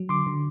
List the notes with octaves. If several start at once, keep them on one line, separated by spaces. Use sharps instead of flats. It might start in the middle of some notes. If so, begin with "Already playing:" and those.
Already playing: F#3
D3 C6 D6
D3